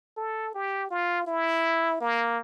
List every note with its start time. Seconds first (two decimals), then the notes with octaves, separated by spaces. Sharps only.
0.17 A4
0.54 G4
0.90 F4
1.27 E4
2.00 A#3